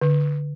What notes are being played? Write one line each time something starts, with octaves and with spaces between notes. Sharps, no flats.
D3